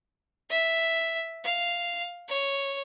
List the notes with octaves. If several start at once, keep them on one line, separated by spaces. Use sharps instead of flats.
E5
F5
C#5